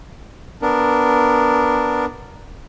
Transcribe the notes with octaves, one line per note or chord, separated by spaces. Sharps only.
B3 D4 A#4